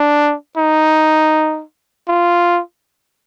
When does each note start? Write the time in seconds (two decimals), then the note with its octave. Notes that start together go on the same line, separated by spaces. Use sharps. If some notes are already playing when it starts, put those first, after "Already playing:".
Already playing: D4
0.57 D#4
2.08 F4